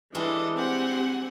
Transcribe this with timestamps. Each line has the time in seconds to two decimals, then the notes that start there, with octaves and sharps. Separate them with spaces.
0.15 E3 G3 G#3 D4 A4 D#5
0.57 C4 G4 F#5 G#5